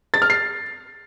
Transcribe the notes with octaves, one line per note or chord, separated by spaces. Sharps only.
A6
F6
C7